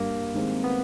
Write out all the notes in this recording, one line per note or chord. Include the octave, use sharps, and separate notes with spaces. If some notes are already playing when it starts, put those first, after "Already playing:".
Already playing: G2 A#3
D#3 G#3 C4
B3